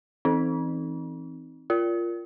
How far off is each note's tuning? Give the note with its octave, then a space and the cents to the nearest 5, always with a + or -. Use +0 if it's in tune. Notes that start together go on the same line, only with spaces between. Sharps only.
E3 +0 C4 +0 D#4 +0
F4 -10 A#4 +0